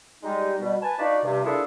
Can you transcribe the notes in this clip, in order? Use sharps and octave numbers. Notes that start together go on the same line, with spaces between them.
G3 G#3 D#4
B2 G3
B4 G#5 A5
D4 D#4 F4 F#4 B4 D5
G2 C3
A#3 D4 E4 F4 G#4 A4